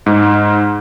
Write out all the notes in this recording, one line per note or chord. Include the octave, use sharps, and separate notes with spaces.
G#2